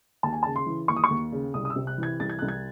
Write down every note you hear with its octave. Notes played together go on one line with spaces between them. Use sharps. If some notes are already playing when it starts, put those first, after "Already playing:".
D#2 A5
G#5
C#3 A5
C6
E3
D#2 C#6
D#6
C#6
D#2
C#3
C2 D#6
D#6
E6
C3
F#6
E3
G#6
C2 A6
G#6
C2 F#6
G#6